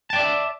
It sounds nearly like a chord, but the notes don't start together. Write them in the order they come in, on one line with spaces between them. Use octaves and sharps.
A5 G5 D5 E5